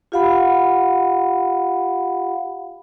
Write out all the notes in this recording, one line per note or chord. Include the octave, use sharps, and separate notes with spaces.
F4 G4 F5 F#5 B5